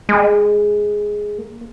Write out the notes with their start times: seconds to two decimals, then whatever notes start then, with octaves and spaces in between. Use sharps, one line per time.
0.09 G#3
1.38 A#3